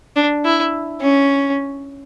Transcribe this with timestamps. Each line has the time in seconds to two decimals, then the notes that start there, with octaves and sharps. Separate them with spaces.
0.16 D4
0.45 E4
1.01 C#4